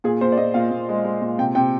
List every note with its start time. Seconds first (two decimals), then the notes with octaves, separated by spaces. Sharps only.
0.04 A#2 G#4
0.21 A#2 C5
0.32 D5
0.38 A#2 D#5
0.54 A#2 F5
0.71 A#2
0.89 G#3
1.05 G#3
1.21 A#2
1.38 C3 G5
1.55 C3 G5